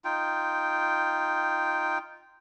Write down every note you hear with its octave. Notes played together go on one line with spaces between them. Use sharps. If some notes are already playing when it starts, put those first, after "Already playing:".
D#4 F4 G5